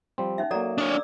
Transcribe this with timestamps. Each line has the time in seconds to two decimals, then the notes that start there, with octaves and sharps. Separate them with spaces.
0.18 F3 G3 C4
0.38 C#4 D#4 E5
0.51 F#3 A#3 A4 D5 A#5
0.78 D4 C#5 D#6
0.90 D5 D6 E6